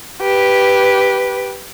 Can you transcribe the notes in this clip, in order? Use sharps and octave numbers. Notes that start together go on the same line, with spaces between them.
G4 B4